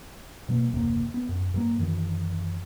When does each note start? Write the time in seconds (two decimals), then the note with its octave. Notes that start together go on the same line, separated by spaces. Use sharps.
0.49 B2 F#3 A#3
0.72 F#1 D#2 C3 A#3
1.14 B3
1.29 F#2
1.54 G2 F#3 A#3
1.79 F#2 D#3 E3 F#3